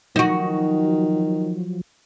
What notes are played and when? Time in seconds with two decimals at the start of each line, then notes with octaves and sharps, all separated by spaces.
0.16 D#3 F3 F#3 D#4 F#4